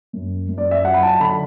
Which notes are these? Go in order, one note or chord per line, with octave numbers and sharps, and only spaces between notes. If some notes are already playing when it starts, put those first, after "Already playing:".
F#2
F#2
D5
E5
F#3 F#5
B5
A5
D3 B5